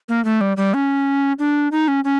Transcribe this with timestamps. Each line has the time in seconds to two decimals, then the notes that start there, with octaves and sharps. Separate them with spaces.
0.09 A#3
0.25 A3
0.41 G3
0.57 G3
0.74 C#4
1.39 D4
1.72 D#4
1.88 C#4
2.04 C#4